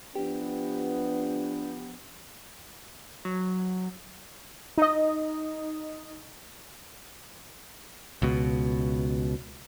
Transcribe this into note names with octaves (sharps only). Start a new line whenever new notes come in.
F3 B3 D4 G4
F#3
D#4 D#5
C#2 B2